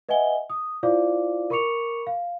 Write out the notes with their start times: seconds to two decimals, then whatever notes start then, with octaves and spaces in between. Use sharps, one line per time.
0.09 B4 D#5 E5 F#5 G#5 G7
0.50 D#6
0.83 E4 F4 C5 D5 F5 D6
1.50 A#4 B5 C#6 D6 C#7 F7
2.07 F5